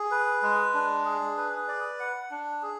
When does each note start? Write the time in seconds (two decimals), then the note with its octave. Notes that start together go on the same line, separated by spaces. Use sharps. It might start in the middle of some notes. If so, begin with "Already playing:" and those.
Already playing: G#4
0.11 B4
0.42 G#3
0.74 D4
1.05 G#4
1.37 B4
1.68 D5
2.00 F#5
2.31 D4
2.63 G#4